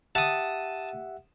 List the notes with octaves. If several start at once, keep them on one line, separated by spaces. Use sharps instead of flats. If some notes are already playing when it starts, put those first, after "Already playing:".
G4 E5 F#5 A5 D#6